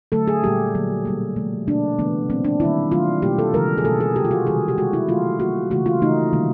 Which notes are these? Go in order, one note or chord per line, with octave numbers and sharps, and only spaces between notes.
D3 F#3 A3 A4
G#4
A#2 G3 A#3 G4
D3 F#3 A#3
B2 G3 A#3
C3 F3 A3
B2 G3 A#3 D4
C#3 E3 A3 B3
A#2 F#3 A#3 C4
D4
D#3 G3 A#3 E4
D#3 F#3 A3 F4
B2 G3 A#3 G4
A4
C#3 E3 G#3 A#4
G#4
B2 G3 A#3 A4
G#4
C3 F3 G#3 G4
F4
F#4
C3 D#3 G3 G#4
G4
D#3 G#3 F#4
E4
D#3 F#3 A3 F4
D#3 G3 A#3 F#4
C#3 E3 A3 F#4
F4
C#3 E3 A3 D#4
C3 D#3 G3 A#3